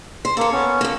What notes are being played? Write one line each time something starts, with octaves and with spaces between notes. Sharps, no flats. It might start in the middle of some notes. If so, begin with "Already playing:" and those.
C5
A#3 A4 C#5
B3 C#4
A3 A#3